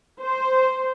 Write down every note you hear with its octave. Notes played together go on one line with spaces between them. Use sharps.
C5